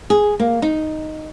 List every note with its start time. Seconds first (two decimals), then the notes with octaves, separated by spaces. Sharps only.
0.10 G#4
0.40 A#3
0.62 D#4